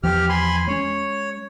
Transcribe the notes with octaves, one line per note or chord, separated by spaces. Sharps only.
E2 E3 F3 G4 F6
G#5 B5 C6
G#3 C#4 C#5